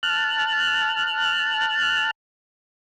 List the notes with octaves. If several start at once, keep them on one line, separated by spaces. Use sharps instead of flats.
A5 F6 F#6